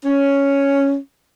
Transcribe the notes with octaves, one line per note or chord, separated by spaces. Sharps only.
C#4